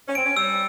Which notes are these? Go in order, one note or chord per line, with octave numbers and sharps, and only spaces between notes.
C#4
C4 D7
C#4
G3 E6